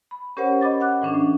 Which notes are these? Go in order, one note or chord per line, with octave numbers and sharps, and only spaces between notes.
B5
C#4 G4 A#4 C5 C#5 F#5
D#5 B5 D6 A6
F#5 D6 F#6
A2 E3 C#4 D4
A2